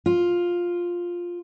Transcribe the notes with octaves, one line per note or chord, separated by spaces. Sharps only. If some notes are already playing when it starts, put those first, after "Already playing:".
F4